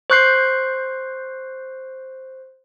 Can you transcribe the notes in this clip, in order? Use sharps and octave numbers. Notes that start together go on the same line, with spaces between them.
C5 C#6 F#6 G6 C7